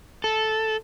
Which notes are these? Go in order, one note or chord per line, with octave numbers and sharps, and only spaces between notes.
A4